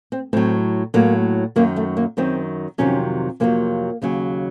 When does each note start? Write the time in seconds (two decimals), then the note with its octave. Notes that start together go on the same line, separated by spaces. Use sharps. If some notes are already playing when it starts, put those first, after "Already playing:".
0.12 C4
0.33 A2 F#3 C4
0.94 A2 F#3 A#3
1.56 F#2 D#3 F#3 A#3
1.76 A3
1.97 A#3
2.17 F#2 D#3 F#3 C4
2.78 F2 C3 D#3 F#3 C#4
3.40 F2 C3 D#3 F#3 A#3
4.02 D#2 C#3 F#3